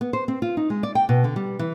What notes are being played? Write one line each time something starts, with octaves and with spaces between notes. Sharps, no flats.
B3
C5
C4
F4
D#4
G#3
D5
G5
B2
D3
G3
E3